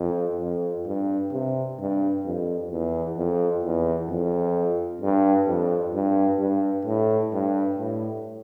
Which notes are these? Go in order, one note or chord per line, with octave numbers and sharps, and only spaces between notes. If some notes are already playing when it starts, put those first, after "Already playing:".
Already playing: F2
F2
G2
C3
G2
F2
E2
F2
E2
F2
G2
F2
G2
G2
A2
G2
A2